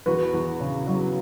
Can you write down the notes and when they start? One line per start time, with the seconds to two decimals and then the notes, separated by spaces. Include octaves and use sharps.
0.06 E2 F#4 B4
0.33 E2
0.60 C#3
0.87 F#3